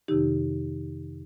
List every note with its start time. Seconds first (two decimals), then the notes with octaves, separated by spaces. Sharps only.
0.08 F2 C3 D#3 D#4 G4